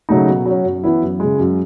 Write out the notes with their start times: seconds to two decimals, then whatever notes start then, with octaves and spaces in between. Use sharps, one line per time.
0.09 C#3 F#3 A3 D#4
0.28 B2
0.46 F#3 C#4
0.64 F#2
0.84 E3 B3 E4
1.01 F#2
1.20 C#3 G#3
1.38 F#2